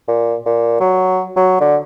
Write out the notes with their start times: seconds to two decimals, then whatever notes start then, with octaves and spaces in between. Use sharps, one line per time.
0.08 A#2
0.46 A#2
0.80 F#3
1.36 F#3
1.60 D3